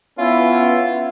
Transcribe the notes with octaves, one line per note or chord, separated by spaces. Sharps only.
B3 C#4 E4 F4